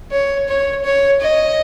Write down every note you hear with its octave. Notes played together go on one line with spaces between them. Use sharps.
C#5
C#5
C#5
D#5